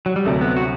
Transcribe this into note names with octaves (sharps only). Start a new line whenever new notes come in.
F#3
G3
D2 C3 F#3 A3
B3
F#4